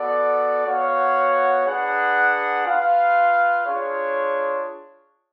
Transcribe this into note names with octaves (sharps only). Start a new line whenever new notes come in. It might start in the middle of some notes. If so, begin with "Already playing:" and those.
Already playing: B3 F#4 A4 D5
B3 F#4 C#5 F5
D4 G#4 B4 F#5
F4 B4 F5
D4 F4 G#4 C#5